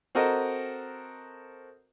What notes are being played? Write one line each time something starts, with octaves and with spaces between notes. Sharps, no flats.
C4 F#4 A4 A#4 D#5